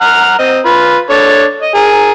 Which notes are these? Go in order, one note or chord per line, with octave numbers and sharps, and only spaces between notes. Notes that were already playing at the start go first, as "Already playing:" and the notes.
F#5 A#5 F6
C4 D#5
F4 B4
D4 A4 C#5
D#5
G#4 A#4